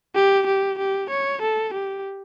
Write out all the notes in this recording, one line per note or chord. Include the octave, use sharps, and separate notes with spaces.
G4
G4
G4
C#5
A4
G4